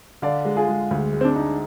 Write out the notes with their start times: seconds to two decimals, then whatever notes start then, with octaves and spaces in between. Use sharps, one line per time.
0.22 D3 D5 F5
0.45 G#3
0.57 F4 G#4
0.68 G#3
0.91 D2
1.13 G#3
1.21 C4
1.24 D4
1.35 D#4